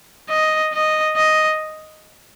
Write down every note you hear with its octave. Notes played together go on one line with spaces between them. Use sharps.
D#5
D#5
D#5